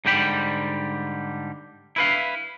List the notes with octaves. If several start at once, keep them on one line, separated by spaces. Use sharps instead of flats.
G#2 D3 G3 G5 B5
E4 B4 F5